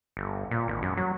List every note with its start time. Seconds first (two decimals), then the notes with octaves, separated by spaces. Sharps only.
0.17 G1
0.51 A#2
0.68 G#1
0.83 F#2
0.97 F#3